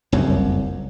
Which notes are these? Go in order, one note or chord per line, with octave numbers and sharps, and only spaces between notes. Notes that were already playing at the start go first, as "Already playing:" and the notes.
F#1 C2 F2